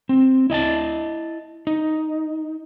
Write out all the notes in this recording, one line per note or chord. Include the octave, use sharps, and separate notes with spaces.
C4
E4 D#5 G#5 A5
D#4